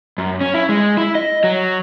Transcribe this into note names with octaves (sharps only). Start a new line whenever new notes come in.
F#2
C#4
E4
G#3
E4
D#5
F#3